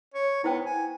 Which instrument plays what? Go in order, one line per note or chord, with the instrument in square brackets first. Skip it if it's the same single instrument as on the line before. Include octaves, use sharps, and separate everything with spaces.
[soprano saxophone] C#5
[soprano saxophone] B3 [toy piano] E4 C5 G5
[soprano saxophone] G#5